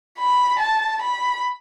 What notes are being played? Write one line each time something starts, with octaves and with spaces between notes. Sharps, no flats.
B5
A5
B5